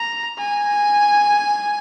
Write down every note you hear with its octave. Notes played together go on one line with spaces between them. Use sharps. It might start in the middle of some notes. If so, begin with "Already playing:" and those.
Already playing: A#5
G#5